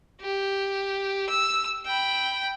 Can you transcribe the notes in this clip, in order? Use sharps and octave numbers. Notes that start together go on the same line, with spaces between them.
G4
E6
G5 B5